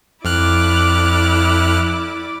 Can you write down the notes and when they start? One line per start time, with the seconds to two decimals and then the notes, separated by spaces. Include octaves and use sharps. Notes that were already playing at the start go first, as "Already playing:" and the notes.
0.25 F2 E4 D5 D6 F6 F#6